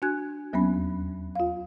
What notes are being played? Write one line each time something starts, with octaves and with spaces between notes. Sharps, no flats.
D4 F#4 G#5 F#6 G#6
D#2 F#3 A#3 B3 C#4 B5
E2
F4 F5